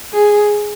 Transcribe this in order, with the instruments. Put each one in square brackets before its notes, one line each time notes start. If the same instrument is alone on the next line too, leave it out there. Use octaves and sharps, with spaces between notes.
[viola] G#4